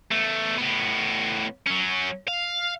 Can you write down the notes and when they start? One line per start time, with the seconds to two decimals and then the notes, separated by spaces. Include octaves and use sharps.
0.11 E2 A3
0.58 A2 B3
1.67 F#3 C#4
2.28 F5